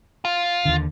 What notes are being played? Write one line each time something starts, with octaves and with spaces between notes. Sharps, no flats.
F4
D#2 D3